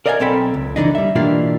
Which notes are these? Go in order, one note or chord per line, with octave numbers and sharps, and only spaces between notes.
A#4 D5 D#5 F5 G5 G#5
B1 C4 A4 G5 B5
C#2
D3 E3 G3 D4 D#4
G3 E5
B2 E3 A#3 D4 F4 G4